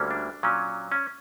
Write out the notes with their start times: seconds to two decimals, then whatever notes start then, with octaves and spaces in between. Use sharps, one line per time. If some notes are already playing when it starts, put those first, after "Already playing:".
Already playing: D2 D3 G3 A#3 C#4
0.11 D4
0.43 A#2 F#3 C#4
0.92 C#4